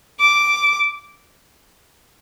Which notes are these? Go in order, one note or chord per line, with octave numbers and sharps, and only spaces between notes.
D6